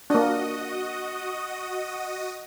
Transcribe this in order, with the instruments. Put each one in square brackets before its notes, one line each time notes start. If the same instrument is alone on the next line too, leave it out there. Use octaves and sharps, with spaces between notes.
[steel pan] A#3 D4 [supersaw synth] F#4 D#5 D#6